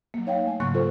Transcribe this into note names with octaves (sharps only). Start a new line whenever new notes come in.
F#3 A#3
D#4 C#5 F5 G5
A3 G#5
G#2 C#3 F#3 A#3 C#6 F#6
F4 A4 C5